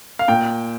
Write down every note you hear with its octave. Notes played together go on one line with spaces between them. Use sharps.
F5
A#2 G5